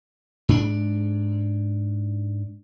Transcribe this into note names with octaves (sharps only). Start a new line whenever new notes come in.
G#2 D4